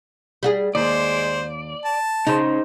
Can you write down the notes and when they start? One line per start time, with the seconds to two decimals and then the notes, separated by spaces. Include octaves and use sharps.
0.43 G3 F#4 G#4
0.75 D#2 G#3 C5 D5
1.85 A5
2.27 C#3 D#4 C5